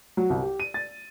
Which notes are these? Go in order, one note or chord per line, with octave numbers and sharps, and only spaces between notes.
F#3
C2
G4
D#7
A6